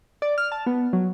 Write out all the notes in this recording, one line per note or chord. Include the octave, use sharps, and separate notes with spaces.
D5
F6
A5
B3
F#3